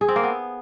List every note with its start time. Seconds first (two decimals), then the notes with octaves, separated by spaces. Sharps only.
0.01 G#4
0.08 C4
0.16 A#3
0.23 B3